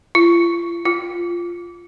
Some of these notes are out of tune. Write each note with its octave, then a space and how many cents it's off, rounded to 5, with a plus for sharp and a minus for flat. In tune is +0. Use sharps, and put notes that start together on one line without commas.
F4 -40
F4 -5